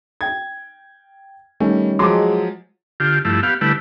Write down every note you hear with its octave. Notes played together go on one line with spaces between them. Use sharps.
G5 G#6
D#3 G3 A3 C#4
F3 F#3 G#3 C6 D6
D3 F4 G4
G2 F3 A3 E4
B3 G4 F5
D3 G3 A3 E4 B4